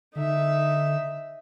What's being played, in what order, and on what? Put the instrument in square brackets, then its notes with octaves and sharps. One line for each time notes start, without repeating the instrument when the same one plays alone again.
[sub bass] D3 [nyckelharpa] D#4 E5